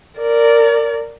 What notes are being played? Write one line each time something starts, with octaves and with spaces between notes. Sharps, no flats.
A#4 D5